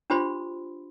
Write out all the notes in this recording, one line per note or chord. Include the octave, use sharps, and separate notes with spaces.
D4 F4 G4 C5 B5 C6